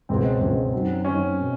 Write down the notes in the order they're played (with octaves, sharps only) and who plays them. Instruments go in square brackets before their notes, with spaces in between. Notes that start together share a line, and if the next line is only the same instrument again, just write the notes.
[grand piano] C#2 B2 G#3 C#4 [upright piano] C4
[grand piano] C#2 B2 G#3 C#4
F#2 D#3 F#3
[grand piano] F#2 D#3 F#3 [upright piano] C#4
[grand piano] B2